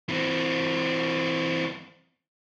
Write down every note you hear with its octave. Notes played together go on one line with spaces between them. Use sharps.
E3 C4